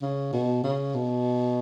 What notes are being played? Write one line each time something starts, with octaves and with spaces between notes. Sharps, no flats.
C#3
B2
C#3
B2